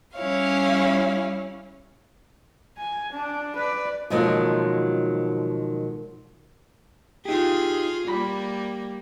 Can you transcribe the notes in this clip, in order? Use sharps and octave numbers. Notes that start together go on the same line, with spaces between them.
G3 C#4 E4 C#5 F5
G#5
D4
B4 D5
B2 D#3 F3 F#3 G#3 A#3
D#4 F4 G4 G#4
G3 A#3 B5